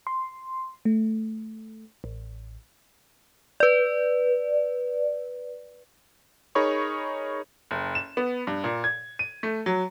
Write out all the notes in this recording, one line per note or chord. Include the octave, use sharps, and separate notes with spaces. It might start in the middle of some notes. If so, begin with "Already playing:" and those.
C6
A3
A1
B4 D5
D#4 G#4 A#4 C#5 B5 C#6
F#1
E7
B3
G2
A#2
G#6
D#7
A3
F#3